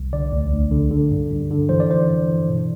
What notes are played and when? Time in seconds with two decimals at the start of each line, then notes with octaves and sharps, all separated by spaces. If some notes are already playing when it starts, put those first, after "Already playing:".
Already playing: C2
0.13 D3 D5
0.32 D2
0.52 D2
0.72 D3
0.91 D3
1.11 G2
1.31 G2
1.51 D3
1.69 E3 C5
1.80 D5
1.89 G2 C5
2.09 G2
2.28 E3
2.48 B2